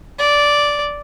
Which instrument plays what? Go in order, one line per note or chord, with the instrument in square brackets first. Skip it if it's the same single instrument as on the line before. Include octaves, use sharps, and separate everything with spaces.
[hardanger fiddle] D5